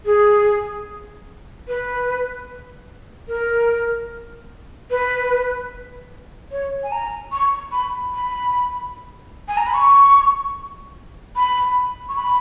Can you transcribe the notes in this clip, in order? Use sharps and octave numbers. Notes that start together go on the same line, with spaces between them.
G#4
B4
A#4
B4
C#5
G#5
A#5
C#6
B5
B5
G#5
A#5
B5
C#6
B5
C#6
B5